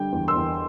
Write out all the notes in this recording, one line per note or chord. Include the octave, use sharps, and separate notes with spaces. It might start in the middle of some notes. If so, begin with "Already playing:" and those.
Already playing: D3 G3 G5
E2
C6 E6
E2